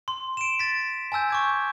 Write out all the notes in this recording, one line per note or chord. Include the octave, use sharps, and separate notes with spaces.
C6
D7 E7
A6 B6
G#5 A5 E6 G6
C#6 D6 G#6